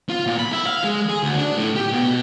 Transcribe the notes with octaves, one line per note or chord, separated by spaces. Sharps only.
F4
A#2
B5
E4
F5
G#3
G#4
D2
D4
A2
G4
B2